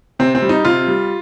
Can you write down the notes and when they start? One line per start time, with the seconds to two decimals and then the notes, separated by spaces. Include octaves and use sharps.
0.19 C3 C4
0.35 C4
0.42 G3
0.49 D#4
0.65 C3 F4
0.88 G3